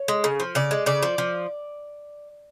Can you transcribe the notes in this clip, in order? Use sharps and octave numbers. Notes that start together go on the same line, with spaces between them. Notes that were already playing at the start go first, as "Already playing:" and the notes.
Already playing: C#5
G#3
C#3
F3
C#3 D5
G#3
C#3 D5
F3
F3